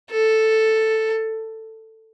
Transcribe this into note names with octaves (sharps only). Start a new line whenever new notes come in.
A4